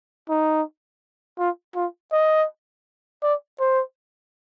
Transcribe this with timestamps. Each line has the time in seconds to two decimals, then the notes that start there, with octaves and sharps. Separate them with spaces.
0.29 D#4
1.38 F4
1.75 F4
2.12 D#5
3.23 D5
3.60 C5